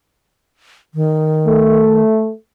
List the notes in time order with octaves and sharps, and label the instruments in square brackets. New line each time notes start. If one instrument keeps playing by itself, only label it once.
[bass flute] D#3
[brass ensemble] A3